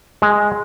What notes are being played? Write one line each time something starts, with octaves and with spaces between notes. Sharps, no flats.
G#3